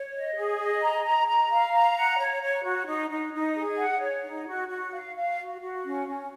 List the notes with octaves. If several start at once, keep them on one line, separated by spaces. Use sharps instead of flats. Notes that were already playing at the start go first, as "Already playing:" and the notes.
Already playing: C#5
D#5
G#4
D#5
A#5
A#5
A#5
F5
A#5
F#5
C#5
C#5
F#4
D#4
D#4
D#4
G#4
F#5
C#5
D#4
F#4
F#4
F5
F5
F#4
F#4
C#4
C#4